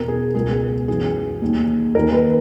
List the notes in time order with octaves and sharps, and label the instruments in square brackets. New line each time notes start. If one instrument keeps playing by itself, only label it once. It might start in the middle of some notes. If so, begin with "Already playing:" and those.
Already playing: [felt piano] E2 B2 A#4
G#4
C#2 B2 G#4
F#2 E3 G#4
D#2 D#3
D#2 D#3 A#4
B4